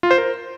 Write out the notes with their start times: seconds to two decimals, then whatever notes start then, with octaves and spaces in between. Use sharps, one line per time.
0.03 F4
0.11 C5
0.18 A#4